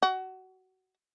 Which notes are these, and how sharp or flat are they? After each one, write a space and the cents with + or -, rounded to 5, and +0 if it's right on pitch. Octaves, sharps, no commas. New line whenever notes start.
F#4 +20